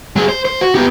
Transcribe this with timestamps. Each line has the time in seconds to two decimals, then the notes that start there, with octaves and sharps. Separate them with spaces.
0.16 F#3 G#4
0.29 C5
0.45 C5
0.61 F#4
0.75 B3 G4